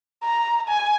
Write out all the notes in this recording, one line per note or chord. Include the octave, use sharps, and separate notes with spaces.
A#5
G#5